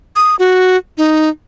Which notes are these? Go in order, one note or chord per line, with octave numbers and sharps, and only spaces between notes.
D#6
F#4
D#4